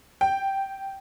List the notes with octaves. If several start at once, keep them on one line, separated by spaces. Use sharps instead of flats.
G5